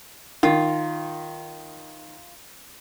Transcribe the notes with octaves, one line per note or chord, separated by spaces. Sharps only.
D#3 F4